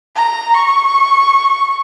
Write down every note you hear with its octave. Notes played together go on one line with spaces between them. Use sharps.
A#5
C#6